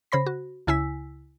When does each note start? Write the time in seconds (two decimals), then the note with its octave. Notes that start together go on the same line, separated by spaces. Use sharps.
0.12 C#3 C5 B5 A#6
0.26 F#4
0.67 C#2 C#3 E4 G#5 E6 B6